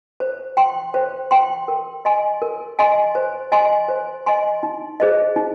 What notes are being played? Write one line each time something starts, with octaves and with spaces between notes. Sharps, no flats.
C5
G5 C6
C5
G5 C6
A#4
D#5 G#5 C6
A#4
D#5 G#5 C6
C5
D#5 G#5 C6
C5
D#5 G#5 C6
D#4
G#4 C5 D#5
D#4